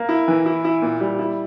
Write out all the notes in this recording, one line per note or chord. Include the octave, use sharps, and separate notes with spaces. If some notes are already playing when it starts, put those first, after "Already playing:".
Already playing: A#3
E4
E3
E4
E4
A#2
G3
E4